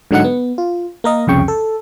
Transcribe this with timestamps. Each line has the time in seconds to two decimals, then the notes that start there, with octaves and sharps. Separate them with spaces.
0.11 G#2 D3 F#3 D#4 F#5 C#7
0.24 B3
0.58 F4
1.04 A#3 A#4 D#5
1.27 C2 F2 C#3 G5 C#6
1.48 A4